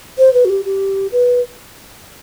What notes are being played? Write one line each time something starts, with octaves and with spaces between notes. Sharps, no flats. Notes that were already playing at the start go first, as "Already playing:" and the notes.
C5
B4
F#4
G4
G4
B4